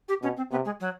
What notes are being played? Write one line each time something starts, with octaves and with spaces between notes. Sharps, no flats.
G4
B2 C#4
C4
C3 B3
G#3
F#3